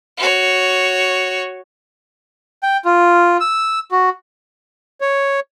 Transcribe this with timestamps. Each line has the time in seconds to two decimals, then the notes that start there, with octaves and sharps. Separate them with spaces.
0.18 F#4 C#5
2.63 G5
2.85 F4
3.40 E6
3.91 F#4
5.01 C#5